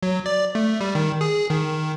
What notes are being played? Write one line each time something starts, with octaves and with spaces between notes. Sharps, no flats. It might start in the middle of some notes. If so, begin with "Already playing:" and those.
F#3
D5
A3
G3
D#3
G#4
D#3